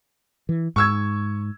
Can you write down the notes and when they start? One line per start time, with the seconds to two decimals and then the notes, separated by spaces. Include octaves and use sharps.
0.49 E3
0.76 G#2 C#6 E6 G#6